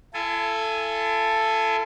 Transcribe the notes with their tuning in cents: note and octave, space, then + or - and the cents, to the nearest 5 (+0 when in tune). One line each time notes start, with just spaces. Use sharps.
E4 +45 A4 +0 G#5 +0